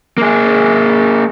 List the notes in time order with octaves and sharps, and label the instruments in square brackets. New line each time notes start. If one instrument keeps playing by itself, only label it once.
[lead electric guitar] A#3 G#4